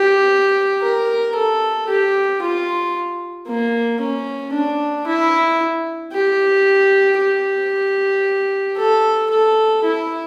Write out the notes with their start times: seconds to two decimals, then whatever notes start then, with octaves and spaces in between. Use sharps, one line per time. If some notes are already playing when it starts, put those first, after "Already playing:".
Already playing: G4
0.82 A#4
1.35 A4
1.88 G4
2.42 F4
3.47 A#3
4.00 C#4
4.53 D4
5.07 E4
6.12 G4
7.18 G4
8.77 A4
9.30 A4
9.84 E4